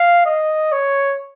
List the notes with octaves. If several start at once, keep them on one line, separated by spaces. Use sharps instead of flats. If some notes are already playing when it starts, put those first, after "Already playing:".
Already playing: F5
D#5
C#5